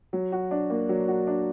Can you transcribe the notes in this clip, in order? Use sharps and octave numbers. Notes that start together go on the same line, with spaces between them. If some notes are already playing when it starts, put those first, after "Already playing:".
F#3
F#4
D4
A#3
F#3
F#4
D4